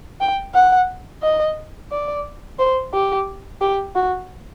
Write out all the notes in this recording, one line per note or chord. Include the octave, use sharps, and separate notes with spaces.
G5
F#5
D#5
D5
C5
G4
G4
F#4